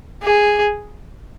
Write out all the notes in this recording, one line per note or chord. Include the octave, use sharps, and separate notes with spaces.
G#4